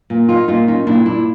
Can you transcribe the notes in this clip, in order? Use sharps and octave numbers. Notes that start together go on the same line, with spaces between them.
A#2
D#4 F4
A#2 D#4 F4
C#4 D#4
A#2 D4 E4
D4 E4